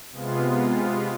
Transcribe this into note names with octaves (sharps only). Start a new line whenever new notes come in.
C3 G#3 B3 F4